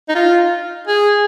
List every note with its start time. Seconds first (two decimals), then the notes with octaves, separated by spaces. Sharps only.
0.09 D#4
0.15 F4
0.87 G#4